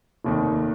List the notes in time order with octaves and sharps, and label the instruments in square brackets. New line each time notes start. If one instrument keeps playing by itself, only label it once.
[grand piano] F1 D#2 D#3